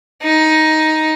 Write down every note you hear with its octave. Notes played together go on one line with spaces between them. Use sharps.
D#4